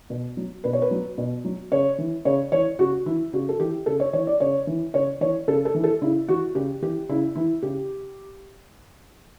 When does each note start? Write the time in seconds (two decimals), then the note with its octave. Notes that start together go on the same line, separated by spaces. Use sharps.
0.10 B2
0.37 F#3
0.64 B2 B4
0.73 C#5
0.82 B4
0.91 F#3
1.18 B2
1.45 F#3
1.72 C#3 C#5
1.98 E3
2.25 C#3 C#5
2.52 E3 C#5
2.79 C#3 F#4
3.06 E3 E4
3.33 C#3 F#4
3.49 A4
3.60 E3 G4
3.86 C#3 A4
4.00 C#5
4.13 E3 C#5
4.27 D5
4.40 C#3 C#5
4.67 E3
4.94 C#3 C#5
5.21 E3 C#5
5.48 C#3 A4
5.65 A4
5.74 E3
5.84 A4
6.01 C#3 E4
6.28 E3 F#4
6.55 C#3 G4
6.82 E3 G4
7.09 C#3 E4
7.35 E3 E4
7.62 C#3 G4